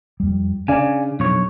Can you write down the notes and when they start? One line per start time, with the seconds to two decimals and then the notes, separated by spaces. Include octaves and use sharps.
0.20 F2 G3
0.68 C#3 D4 D5 F5 G#5
1.20 B1 F2 C#5